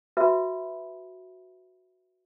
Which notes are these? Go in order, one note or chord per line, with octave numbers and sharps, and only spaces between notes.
F#4 B4 E5 B5